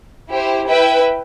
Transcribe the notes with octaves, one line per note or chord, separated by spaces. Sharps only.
E4 G4 C5
E4 B4 E5 G5